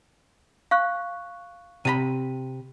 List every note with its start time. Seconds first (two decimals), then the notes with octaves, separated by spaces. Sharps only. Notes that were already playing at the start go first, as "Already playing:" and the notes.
0.71 F5 C#6 F#6
1.85 C3 D5 B5 D#7